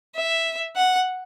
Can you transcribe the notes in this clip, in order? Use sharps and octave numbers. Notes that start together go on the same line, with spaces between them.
E5
F#5